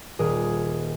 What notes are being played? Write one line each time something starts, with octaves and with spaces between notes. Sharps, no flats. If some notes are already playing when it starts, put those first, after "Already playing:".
D#1 G#4 A#4